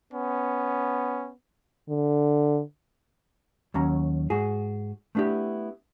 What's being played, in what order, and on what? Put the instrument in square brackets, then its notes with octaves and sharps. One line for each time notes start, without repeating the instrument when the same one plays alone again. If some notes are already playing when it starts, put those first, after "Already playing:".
[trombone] B3 [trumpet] C#4
[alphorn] D3
[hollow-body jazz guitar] D#2 F#3 C#4 A#5
G#2 F#4 G#4
A3 B3 D4 E4 G4